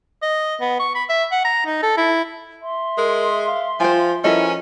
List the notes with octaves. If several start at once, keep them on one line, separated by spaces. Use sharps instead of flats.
D#5
B3
C#6
B5
E5
F#5
A#5
D#4
A4
E4
E5 C6
G#3 A#4
F5
F3 F4 C5 G5 G#5
F3 C#4 E4 A4 A#4 D#5 G5 G#5